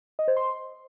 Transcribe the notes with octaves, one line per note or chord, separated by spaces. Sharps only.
D#5
C5
C6